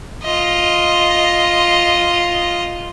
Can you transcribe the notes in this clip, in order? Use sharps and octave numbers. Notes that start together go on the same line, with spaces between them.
F4 D#5